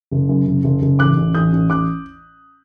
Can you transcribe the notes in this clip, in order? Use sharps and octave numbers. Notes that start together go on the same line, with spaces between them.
F#1
F#2
F#1
F#1
F#1
A1 D6 F#6
A1
A1 D#6 G6
A1
A1 D6 F#6